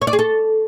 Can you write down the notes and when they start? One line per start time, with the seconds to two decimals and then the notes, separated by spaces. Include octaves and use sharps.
0.02 C#5
0.07 D5
0.13 G#4
0.19 A4